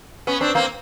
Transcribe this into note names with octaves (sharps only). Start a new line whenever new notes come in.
B3 C#4
C4 D4
A#3 C4